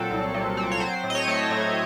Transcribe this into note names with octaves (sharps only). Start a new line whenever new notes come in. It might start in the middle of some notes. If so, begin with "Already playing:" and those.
Already playing: A#2 F#3 C4 A4
C2
A#2
C4
C#5
F#3 C5
A2
D#5
C#5
A3
A2